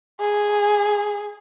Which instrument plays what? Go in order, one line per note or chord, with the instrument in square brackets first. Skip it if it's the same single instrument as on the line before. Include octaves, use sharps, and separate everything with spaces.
[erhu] G#4